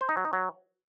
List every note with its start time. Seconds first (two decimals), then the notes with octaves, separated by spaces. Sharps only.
0.01 C5
0.09 D#4
0.17 F#3
0.25 D#4
0.33 F#3